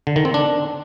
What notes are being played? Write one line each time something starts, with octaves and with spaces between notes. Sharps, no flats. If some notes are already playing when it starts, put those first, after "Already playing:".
D3
D#3
C4
D4